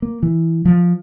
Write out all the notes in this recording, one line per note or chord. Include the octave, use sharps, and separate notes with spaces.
A#3
E3
F3